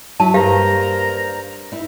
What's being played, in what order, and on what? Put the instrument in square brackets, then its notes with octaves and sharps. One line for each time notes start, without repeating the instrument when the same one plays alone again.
[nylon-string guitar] F#3 E4 [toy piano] A5
[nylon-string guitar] G2 [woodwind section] A#3 C5 A#5 [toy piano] G4 F5
[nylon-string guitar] D#4 E4